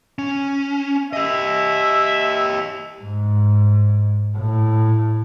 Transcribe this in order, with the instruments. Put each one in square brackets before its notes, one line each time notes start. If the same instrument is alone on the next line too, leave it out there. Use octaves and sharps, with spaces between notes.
[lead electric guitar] C#4
[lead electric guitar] G4 D#5 [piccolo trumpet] E5
[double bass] G#2
A2